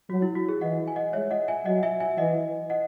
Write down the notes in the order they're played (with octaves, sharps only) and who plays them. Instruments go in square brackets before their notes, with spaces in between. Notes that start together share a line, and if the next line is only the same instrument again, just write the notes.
[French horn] F#3 [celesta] F#4
[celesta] E4
F#4
G#4
[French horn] E3 [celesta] D#5 F#5
[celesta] G#5
D#5 F#5
[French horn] G#3 [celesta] C#5 E5
[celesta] D#5 F#5
E5 G#5
[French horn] F#3 [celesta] D#5 F#5
[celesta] E5 G#5
E5 G#5
[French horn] E3 [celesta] D#5 F#5
[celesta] D#5 F#5